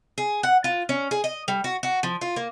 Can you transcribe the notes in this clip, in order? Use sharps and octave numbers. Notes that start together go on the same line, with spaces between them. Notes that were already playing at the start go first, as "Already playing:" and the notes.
G#4
F#5
F4
C#4
G#4
D#5
G3
F#4
F#4
F3
F4
A#3